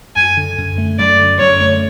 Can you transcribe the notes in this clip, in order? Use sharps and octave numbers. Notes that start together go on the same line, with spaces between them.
F#2 G#5
D3
F#2
A3
F#2 D5
D3
F#2 C#5
A3